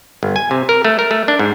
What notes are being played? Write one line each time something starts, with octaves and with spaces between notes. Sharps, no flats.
G1
G#5
C3
A#4
A3
A#4
A3
D4
G#2